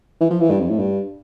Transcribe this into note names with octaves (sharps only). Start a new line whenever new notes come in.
E3
F3
E3
G2
F2
A2
G2